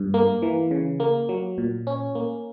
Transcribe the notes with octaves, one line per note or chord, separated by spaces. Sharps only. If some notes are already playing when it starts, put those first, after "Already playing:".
Already playing: G2
A#3
E3
C#3
A#3
F#3
A#2
C#4
A#3